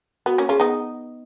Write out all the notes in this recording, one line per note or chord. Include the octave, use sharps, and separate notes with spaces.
B3 F#4
A#3 C#4
C#4 F4 G#4
B3 D#4